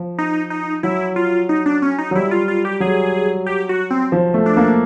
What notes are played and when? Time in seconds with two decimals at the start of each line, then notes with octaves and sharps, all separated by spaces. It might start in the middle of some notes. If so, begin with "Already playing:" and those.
Already playing: F3
0.18 D#4
0.50 D#4
0.83 F#3 E4
1.16 F4
1.49 D#4
1.66 D4
1.82 C#4
1.98 D#4
2.11 F#3
2.15 G3 E4
2.31 F4
2.48 F4
2.65 G4
2.80 F#3 G#4
3.46 G4
3.69 F#4
3.90 C4
4.12 F3
4.34 A3
4.46 D4
4.57 A#3